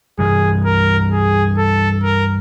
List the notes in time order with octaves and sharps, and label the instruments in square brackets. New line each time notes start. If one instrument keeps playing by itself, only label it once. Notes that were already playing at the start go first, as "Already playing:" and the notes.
[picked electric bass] G2 E3 G3 [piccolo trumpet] G#4
[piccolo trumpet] A#4
G#4
A4
A#4